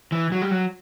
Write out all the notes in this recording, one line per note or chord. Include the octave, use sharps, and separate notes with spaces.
E3
F#3
G3
F#3